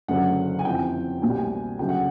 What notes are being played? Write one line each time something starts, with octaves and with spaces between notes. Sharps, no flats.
F#1 F#2 D3 F#3 F#5
G#5
F2 C3 E3 G5
C2 B2 G3 A#3 G#5
G5
G#5
D2 C#3 F#3 A3 C#4 G5
F#5